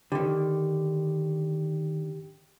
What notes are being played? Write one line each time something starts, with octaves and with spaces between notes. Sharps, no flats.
D3 D#3 G4